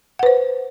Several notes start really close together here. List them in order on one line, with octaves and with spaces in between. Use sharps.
F#5 B4 C5